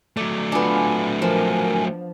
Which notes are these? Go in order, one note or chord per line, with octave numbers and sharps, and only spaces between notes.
F#3 A3 D5
B3 D4 F4 G#5
F3 A#4 G#5